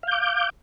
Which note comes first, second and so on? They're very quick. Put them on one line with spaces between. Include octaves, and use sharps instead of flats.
F5 G6 D6